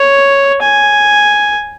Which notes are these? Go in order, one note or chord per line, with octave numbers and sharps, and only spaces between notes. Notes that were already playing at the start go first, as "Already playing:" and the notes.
Already playing: C#5
G#5